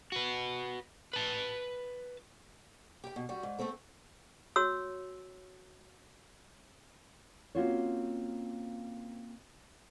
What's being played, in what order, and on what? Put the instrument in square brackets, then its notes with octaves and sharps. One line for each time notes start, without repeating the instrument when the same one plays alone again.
[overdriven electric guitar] F#4 B4
B4 A5
[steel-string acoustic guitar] G4 G5
B2
G3 F#4
G#2
A3 B3 C4 A4
[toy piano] F#4 C#5 E6
[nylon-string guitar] A#3 C4 C#4 F4 F#4 C#5